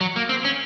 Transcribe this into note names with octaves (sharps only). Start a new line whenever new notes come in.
F#3
A#3
C4
C#4